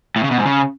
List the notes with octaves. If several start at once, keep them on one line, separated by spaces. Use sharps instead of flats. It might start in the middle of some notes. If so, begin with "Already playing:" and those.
A2
C#3
B2
G#2
C#3